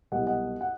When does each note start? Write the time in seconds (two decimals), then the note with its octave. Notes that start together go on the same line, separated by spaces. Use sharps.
0.12 C2 B2 F#3 D#5 F#5
0.27 D#5 F#5
0.61 F#5